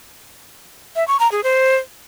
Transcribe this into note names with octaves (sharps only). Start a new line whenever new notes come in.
E5
C#6
A#5
G#4
C5